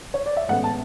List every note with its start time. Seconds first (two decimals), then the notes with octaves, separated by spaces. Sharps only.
0.14 C#5
0.26 D5
0.37 E5
0.49 A1 A2 G#3 B3 F#5
0.64 A5